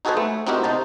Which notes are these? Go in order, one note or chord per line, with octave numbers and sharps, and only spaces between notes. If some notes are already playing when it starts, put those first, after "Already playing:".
D#4 F#4 G#4 A4 B4 C5
A3
C4 D#4 E4 F#4 G4 A#4
C3 D#4 C5 A5